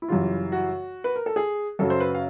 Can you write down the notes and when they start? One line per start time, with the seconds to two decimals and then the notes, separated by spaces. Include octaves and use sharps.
0.02 E4
0.08 F#2 C#3 E3 G3 F4
0.52 F#4
1.04 B4
1.16 A#4
1.26 A4
1.36 G#4
1.79 F#2 C#3 F#3 A4
1.90 C5
2.00 B4
2.15 F5